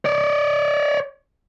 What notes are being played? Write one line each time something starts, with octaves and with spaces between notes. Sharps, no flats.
C#5 D5